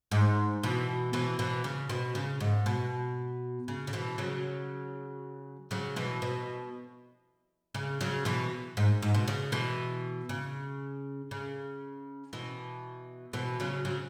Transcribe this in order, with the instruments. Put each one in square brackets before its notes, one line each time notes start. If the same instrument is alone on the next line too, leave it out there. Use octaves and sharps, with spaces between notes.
[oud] G#2
B2 E3
B2 E3
B2 E3
C#3
B2
C#3
G#2
B2
C#3
C#3
B2 E3
C#3 F#3
C#3 F#3
B2 E3
B2
C#3
C#3 F#3
B2 E3
G#2
G#2
B2
C#3
B2 E3
C#3
C#3
B2 E3
B2 E3
C#3 F#3
C#3 F#3